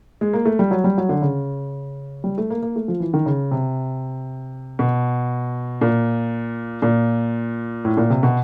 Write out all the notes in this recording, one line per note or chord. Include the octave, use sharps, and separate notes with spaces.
G#3
A#3
A3
G3
F#3
G3
F#3
D3
C#3
G3
A3
A#3
A#3
A3
F3
E3
D#3
C#3
C3
B2
A#2
A#2
A2
A#2
C3
B2